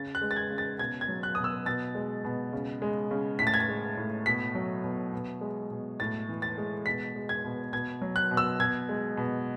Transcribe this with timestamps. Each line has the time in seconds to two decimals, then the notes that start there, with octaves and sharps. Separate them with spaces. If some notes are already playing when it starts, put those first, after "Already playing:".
Already playing: C#3 A6
0.15 F#6
0.22 G#3
0.31 A6
0.36 G#6
0.50 C#3
0.58 A6
0.79 B2 G#6
1.01 G#6
1.08 F#3
1.23 F#6
1.35 B2 D#6
1.44 E6
1.66 B2 A6
1.95 G#3
2.25 B2
2.53 C#3
2.82 G#3
3.11 C#3
3.39 A2 B6
3.47 A6
3.54 G#6
3.60 A6
3.69 G#3
3.97 A2
4.26 B2 B6
4.55 F#3
4.84 B2
5.13 B2
5.41 G#3
5.71 B2
6.00 A2 A6
6.29 E3
6.42 A6
6.58 G#3
6.86 B2 B6
7.16 G#3
7.29 G#6
7.44 B2
7.73 B2 G#6
8.01 F#3
8.16 F#6
8.31 B2
8.37 E6
8.60 B2 G#6
8.89 G#3
9.17 B2